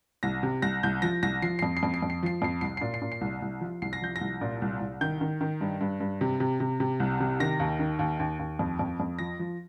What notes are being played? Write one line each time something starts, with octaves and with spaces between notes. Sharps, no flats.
C2 A#6
C3
C2 A#6
C2 G6
F3 A#6
C2 A#6
F3 C7
C7
F2
C7
F2
C7
F2
C7
F3 C7
F2 C7
C2 C7
C7
A#2
C7
A#2
C7
C2
C2
F3
C2 C7
A#6
F3 G6
A#6
C2
A#2
C2
C2
D#3 G6
D#3
D#3
G2
G2
G2
C3
C3
C3
C3
C2
C3
D#3 A#6
D#2
D#3
D#2
D#2
D#2
F2
F2
F2
F3 A#6
F3